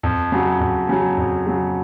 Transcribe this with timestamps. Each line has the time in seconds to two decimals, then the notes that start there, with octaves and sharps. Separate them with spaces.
0.03 F2
0.32 C#3 F#3
0.60 F2
0.89 C#3 F#3
1.18 F2
1.47 C#3 F#3